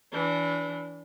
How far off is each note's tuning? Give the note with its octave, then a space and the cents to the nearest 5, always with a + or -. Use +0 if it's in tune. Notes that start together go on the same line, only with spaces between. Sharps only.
E3 +0 D4 -30